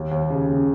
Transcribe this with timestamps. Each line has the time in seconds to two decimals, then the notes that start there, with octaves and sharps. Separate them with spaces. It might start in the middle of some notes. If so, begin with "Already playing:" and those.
Already playing: D#2
0.11 D#2
0.30 C#3
0.48 C#3